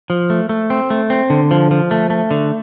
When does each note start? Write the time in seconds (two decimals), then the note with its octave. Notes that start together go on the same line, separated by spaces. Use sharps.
0.10 F3
0.30 A3
0.49 A3
0.70 C4
0.90 A3
1.10 C4
1.30 D3
1.51 F3
1.71 F3
1.91 A3
2.10 A3
2.31 D3